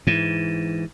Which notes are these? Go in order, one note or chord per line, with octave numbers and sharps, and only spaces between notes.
G#2 E3